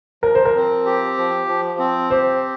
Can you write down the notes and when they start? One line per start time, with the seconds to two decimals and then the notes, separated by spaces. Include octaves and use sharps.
0.23 F3 A#4
0.35 C5
0.45 A#4
0.55 C4
0.86 G4
1.18 F3
1.48 F3
1.79 C4
2.10 G4 C5